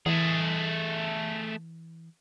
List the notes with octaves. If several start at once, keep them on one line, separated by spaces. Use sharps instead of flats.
E3 A3 G#4